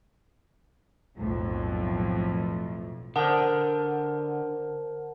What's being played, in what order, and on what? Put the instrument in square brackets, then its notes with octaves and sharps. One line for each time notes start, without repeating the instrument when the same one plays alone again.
[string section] B1 F2 A2
[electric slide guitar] D3 [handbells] A#4 C5 [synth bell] F#5 A5